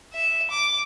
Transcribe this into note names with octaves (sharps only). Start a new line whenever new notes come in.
E5
D6